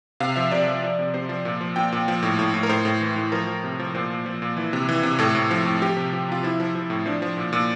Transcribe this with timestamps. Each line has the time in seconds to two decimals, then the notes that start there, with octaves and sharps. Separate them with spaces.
0.20 C3 F5
0.36 F3 E5
0.51 C3 D5
0.67 F3
0.84 F3
0.99 C3
1.14 C3 C5
1.29 F3
1.45 A#2
1.61 F3
1.76 A#2 G5
1.92 A#2
2.08 F3
2.23 A2
2.39 A2
2.54 A2
2.63 A#4
2.69 A2 C5
2.85 A2
3.01 E3
3.16 A2
3.32 F3 A#4
3.47 F3
3.64 C3
3.80 F3
3.95 A#2 C5
4.10 A#2
4.26 F3
4.42 A#2
4.57 E3
4.73 C3
4.89 E3
5.03 C3
5.19 A2 A4
5.35 A2
5.51 F3
5.65 A2
5.82 F3 G4
5.97 C3
6.13 F3
6.29 C3 F4
6.43 F3 E4
6.60 F3
6.75 F3
6.90 A2
7.06 F3 D4
7.22 F3
7.37 A#2
7.53 A#2